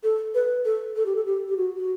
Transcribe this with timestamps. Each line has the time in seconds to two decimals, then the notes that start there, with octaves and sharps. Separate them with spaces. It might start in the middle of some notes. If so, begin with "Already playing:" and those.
0.04 A4
0.35 B4
0.65 A4
0.96 A4
1.06 G4
1.16 A4
1.26 G4
1.48 G4
1.57 F#4
1.77 F#4